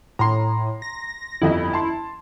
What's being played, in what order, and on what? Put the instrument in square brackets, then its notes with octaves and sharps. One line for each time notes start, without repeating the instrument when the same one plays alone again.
[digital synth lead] A2 [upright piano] A#5 C6
[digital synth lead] A#6
[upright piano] G1 F2 D#5 [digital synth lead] E4
[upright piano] A5 C6